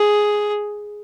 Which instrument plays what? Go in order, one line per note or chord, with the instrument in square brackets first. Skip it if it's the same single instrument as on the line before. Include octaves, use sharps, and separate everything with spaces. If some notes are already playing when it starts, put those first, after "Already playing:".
Already playing: [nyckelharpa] G#4